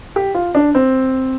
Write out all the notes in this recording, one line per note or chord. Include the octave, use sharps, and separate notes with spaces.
G4
F4
D4
C4